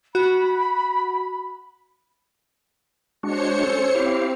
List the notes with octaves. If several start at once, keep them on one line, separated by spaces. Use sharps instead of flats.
F#4 B5
G#3 D4 F#4 C5 C#5 C#7
C#4 A4
C4 E4 G4 F5